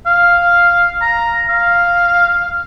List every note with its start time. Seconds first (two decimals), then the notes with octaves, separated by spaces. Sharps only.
0.06 F5
1.01 A#5
1.49 F5